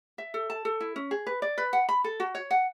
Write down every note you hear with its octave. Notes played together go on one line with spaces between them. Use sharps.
E5
A4
A5
A4
E4
C#4
G#4
B4
D5
B4
F#5
B5
A4
F#4
C#5
F#5